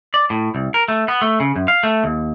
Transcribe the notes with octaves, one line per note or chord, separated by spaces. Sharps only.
D5
A2
C2
A#4
A3
B3
A3
C#3
F#2
F5
A3
D#2